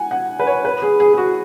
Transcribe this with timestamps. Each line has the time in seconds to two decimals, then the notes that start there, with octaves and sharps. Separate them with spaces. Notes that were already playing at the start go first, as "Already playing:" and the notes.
Already playing: F#5 G#5
0.11 F#5
0.40 B4
0.47 C#5
0.65 B4
0.82 G#4
1.00 G#4
1.13 G#4
1.18 F#4